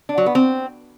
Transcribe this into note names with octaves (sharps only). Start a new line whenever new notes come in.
D4
F#3
B3
C4